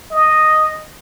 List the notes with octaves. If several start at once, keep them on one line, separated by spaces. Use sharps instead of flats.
D#5